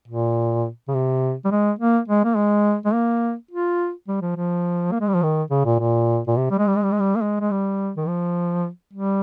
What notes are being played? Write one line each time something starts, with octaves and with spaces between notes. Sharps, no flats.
A#2
C#3
C3
G3
G#3
A#3
G#3
A#3
G#3
G#3
A#3
F4
G3
F3
F3
A#3
G#3
G3
F3
D#3
C#3
A#2
A#2
A#2
C3
G3
G#3
G3
G#3
G3
G#3
G3
A#3
G#3
G#3
G3
D#3
F3
G3